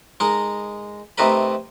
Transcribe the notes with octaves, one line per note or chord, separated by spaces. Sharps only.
G#3 D#4 A#4 A#5
C3 A3 D#4 A#4 B4 B5